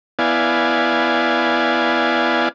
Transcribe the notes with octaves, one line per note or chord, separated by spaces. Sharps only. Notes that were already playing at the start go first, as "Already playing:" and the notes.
B3 E4 D5 F5 G#5